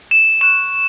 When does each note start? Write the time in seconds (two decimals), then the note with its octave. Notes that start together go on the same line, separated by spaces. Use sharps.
0.11 E7
0.41 C#6 F#6 E7